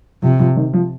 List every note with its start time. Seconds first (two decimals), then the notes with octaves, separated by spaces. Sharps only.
0.22 C3 F3
0.39 F3
0.56 D#3
0.73 F3